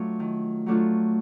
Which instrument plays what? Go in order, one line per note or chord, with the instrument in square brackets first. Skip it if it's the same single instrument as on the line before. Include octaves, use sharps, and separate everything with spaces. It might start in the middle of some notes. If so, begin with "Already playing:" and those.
Already playing: [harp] F#3 A3 D4 F4
D#3
F#3 A3 D4 F4